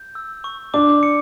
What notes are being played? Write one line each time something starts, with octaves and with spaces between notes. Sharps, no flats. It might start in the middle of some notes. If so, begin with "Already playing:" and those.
Already playing: G6
E6
C#6
D4 D6
C#7